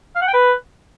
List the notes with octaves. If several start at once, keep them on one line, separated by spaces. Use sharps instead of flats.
F5
F#5
G5
B4